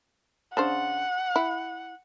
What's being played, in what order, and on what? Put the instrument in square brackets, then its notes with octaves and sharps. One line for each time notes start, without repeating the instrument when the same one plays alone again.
[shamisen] C#3 D4 C5 [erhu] F#5
[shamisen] E4